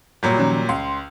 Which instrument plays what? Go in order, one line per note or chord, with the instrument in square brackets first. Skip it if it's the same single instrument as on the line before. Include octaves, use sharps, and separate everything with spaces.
[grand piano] A#2 F#3 G3
[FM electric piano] D#3 F3 C#4
[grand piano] C#2 [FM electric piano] C6